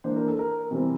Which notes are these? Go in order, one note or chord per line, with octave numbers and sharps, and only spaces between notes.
E3 A#3 D4 C5
A#4
A4
A#4
C3 E3 G3 C4